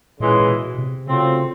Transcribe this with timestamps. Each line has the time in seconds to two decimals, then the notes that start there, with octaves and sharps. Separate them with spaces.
0.20 A#2 C#3 E3 G#3
0.40 A#2
0.48 B2
0.78 C3
1.06 C#3 F#3 A3 C4 F4